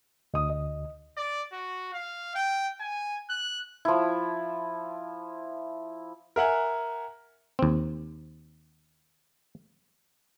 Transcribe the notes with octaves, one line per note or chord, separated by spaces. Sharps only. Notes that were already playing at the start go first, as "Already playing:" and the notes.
D2 D#5 D#6
D#5
D5
F#4
F5
G5
G#5
F#6
F3 E4
A#4 E5 F#5 G#5
D#2 C4